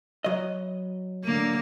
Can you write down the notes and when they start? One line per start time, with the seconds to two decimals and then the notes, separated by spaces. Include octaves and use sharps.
0.24 F#3 D#5
1.25 D3 A#3